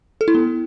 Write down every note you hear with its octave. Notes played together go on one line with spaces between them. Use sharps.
A4
E4
B3